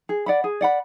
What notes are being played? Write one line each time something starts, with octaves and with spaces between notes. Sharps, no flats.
G#4
D5 F#5 B5
G#4
D5 F#5 B5